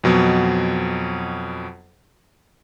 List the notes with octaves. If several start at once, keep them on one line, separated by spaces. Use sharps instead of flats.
F2 B2 F#3